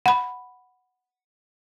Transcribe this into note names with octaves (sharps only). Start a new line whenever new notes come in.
F#5 B5